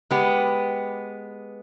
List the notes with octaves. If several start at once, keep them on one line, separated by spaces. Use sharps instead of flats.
G#3 B3 G4